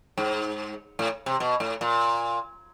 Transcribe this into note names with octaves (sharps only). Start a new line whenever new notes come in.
G#2
A2
C3
B2
A2
A#2